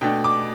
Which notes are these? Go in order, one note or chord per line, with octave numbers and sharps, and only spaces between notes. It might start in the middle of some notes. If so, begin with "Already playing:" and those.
B2 A3 D4 G5
D6